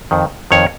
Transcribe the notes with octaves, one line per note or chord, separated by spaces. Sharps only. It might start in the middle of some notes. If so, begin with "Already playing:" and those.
F2 D#3
F2 D#3 C#5